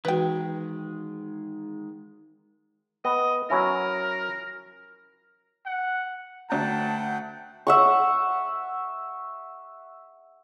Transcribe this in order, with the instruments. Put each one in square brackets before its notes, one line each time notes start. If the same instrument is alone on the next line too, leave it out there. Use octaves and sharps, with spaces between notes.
[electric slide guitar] D#3 G#3 [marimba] E3 F#4 [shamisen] B4 G5
[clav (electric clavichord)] B3 [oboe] D#5
[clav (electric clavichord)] F#3 C#4 E4 [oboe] A#4
[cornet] F#5
[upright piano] D2 A#5 [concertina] F#5 G5 [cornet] A5
[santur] E5 F#5 C#6